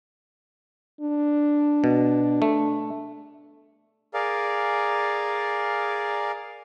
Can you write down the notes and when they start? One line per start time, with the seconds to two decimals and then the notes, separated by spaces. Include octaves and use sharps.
1.01 D4
1.84 B2
2.42 A3
4.14 G#4 A#4 D5 F5